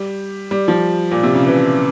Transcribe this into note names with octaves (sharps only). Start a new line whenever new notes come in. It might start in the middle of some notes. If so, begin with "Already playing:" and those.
Already playing: G3
G3
F3
A#2
C3
C#3
E3